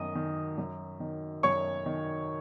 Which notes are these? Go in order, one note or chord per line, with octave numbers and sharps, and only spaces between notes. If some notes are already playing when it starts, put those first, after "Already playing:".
Already playing: F#2 D#3 D#5 D#6
D#3
F#2
D#3
F#2 C#5 C#6
D#3